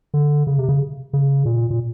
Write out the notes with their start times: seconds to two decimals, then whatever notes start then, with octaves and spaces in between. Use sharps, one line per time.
0.14 D3
0.47 C#3
0.58 C3
0.69 C#3
1.13 C#3
1.45 A#2
1.70 A#2